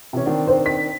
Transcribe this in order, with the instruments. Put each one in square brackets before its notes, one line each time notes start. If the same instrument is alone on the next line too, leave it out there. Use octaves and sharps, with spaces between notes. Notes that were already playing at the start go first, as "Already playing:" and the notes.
[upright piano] C3 E3 C#4
D#3 C4 D4
[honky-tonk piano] C5
B6